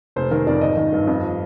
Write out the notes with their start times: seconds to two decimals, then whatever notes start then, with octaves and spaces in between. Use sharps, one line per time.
0.16 F1 C5
0.31 D#3 A#4
0.47 F2 D5
0.61 G#1 D#5
0.77 D#3
0.92 G2
1.07 F2
1.23 F3